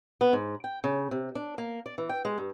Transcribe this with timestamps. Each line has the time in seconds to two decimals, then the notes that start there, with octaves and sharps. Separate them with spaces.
0.21 B3
0.33 G#2
0.64 G5
0.84 C#3
1.11 C3
1.35 D4
1.58 A#3
1.86 D5
1.98 E3
2.09 G5
2.25 G#3
2.38 G2